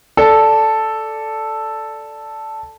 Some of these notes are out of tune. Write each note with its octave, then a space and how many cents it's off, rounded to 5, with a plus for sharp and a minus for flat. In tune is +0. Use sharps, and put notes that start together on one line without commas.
A4 +0 D5 +0